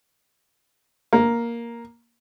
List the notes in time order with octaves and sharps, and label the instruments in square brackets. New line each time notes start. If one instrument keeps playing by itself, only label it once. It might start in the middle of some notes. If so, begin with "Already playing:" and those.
[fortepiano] A#3